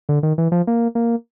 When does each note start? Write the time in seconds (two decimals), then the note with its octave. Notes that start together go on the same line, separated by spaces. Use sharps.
0.09 D3
0.23 D#3
0.38 E3
0.52 F3
0.67 A#3
0.95 A#3